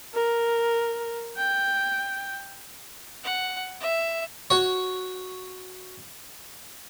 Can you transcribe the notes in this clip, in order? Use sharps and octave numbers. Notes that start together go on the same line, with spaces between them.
A#4
G5
F#5
E5
F#4 C#5